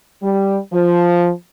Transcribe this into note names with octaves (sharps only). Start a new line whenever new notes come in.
G3
F3